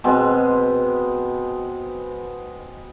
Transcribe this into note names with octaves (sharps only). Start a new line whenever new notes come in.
B2 G#3 C4